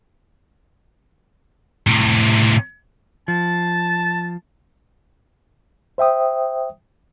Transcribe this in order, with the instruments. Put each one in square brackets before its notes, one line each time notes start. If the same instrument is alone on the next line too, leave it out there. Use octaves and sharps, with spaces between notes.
[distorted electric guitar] A2 C3
[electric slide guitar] F3 [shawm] A5
[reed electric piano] C5 E5 G5 D#6